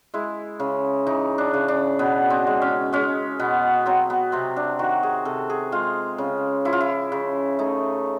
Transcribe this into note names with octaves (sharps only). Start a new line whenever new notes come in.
G#3 E4
C#3
E3 D#4
D4
C#3
D4
B2 B3
C4
G#3
C#4
G#3 C#4
B2 B3
F#3 C4
B3
C3 C4
D4
D#3 F#4
G#4
C3 A4
G#4
G#3 F4
C#3
F3 E4
F4
E4
C#3
A3 D#4